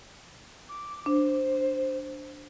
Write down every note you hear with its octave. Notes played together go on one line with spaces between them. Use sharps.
D6
D4 C5